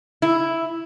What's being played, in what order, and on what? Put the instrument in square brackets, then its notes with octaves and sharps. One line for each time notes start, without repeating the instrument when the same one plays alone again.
[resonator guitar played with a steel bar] E4